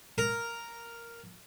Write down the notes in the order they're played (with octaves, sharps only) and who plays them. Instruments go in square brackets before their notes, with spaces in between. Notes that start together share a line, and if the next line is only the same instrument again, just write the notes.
[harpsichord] A#4